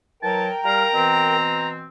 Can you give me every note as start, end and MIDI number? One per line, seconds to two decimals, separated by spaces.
0.23 0.48 52
0.23 0.48 54
0.23 1.36 70
0.23 1.36 79
0.23 0.48 81
0.64 0.84 55
0.64 0.84 77
0.64 1.68 82
0.93 1.86 47
0.93 1.86 52
0.93 1.86 60